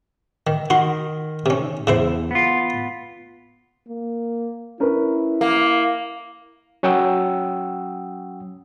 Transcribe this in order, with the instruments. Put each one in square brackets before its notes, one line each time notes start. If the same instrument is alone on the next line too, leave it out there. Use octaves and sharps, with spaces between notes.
[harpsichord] D#3
[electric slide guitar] D#3 [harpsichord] F#4 C6
[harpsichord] C3 C#4
[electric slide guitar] E2 [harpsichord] C#3 E4 C5
[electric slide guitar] B3 F4
[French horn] A#3
[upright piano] C#4 A#4 B4 [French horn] E4
[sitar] A#3
[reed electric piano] F#3 C#4 F#5 G5 D#6 E6